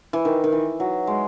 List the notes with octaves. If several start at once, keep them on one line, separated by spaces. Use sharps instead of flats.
E3
D#3
D#3
E3
F#3
G#3